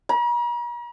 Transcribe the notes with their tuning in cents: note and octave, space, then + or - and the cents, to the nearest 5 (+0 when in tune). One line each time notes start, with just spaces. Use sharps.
A#5 +45